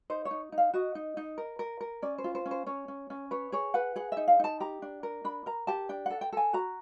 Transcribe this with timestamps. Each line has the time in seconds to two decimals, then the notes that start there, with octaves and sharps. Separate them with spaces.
0.10 D#4 C5
0.25 C#5
0.31 D#4
0.52 D#4
0.58 F5
0.74 F#4 D#5
0.95 D#4
1.17 D#4
1.38 A#4
1.59 A#4
1.81 A#4
2.02 C#4 D5
2.18 C5
2.24 F4
2.35 C5
2.46 C#4
2.51 C5
2.66 C#4 C#5
2.88 C#4
3.10 C#4
3.31 B4 C#5
3.52 G#4 C#5
3.74 B4 F#5
3.96 G#4 F#5
4.12 D#4 E5
4.28 F5
4.39 D#4 A5
4.60 G4 A#5
4.82 D4
5.03 A#4
5.24 D4 B5
5.46 A#4 A#5
5.67 G4 A5
5.89 D4 G5
6.06 A4 F#5
6.21 G5
6.33 A4 G#5
6.53 F#4 A#5